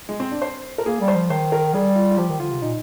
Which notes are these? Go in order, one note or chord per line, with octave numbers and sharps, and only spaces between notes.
G#3
C4
D4
C5
A#4
A#3 G#4
G3
C5
F3
D#3 C5
A#4
G3 G#4
F4
F4
F3 G4
D#3
D3 F4
C3
A#2 D#4